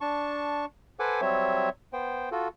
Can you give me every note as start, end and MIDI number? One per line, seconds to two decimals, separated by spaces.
0.01 0.65 62
0.01 0.65 81
0.01 0.65 85
1.00 1.21 69
1.00 1.21 71
1.00 1.21 72
1.00 1.21 78
1.00 1.21 80
1.00 1.21 86
1.21 1.69 54
1.21 1.69 55
1.21 1.69 60
1.21 1.69 73
1.21 1.69 76
1.93 2.29 59
1.93 2.29 72
1.93 2.29 79
2.32 2.48 65
2.32 2.48 66
2.32 2.48 69